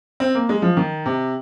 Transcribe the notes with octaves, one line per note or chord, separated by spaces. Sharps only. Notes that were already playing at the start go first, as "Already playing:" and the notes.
C4
A#3
G#3
F3
D#3
C3